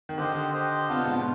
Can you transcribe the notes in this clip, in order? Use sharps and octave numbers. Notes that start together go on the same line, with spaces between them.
D#3
D3 G4 C5 D#5
G4 C5 D#5
C3 B3 D4 F4 C5 F5
B2
G#2
B2